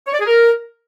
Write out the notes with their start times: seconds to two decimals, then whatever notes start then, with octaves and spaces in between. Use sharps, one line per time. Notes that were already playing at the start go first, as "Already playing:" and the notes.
0.07 C#5
0.13 D5
0.20 G#4
0.27 A#4